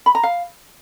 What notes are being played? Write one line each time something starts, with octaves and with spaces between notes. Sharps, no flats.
B5
A#5
F5